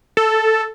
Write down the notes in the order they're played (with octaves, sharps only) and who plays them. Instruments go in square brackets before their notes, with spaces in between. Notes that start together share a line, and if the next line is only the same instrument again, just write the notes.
[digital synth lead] A4